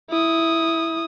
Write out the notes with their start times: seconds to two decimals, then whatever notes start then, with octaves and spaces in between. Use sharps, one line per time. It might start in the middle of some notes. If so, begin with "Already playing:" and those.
0.10 E4 D#6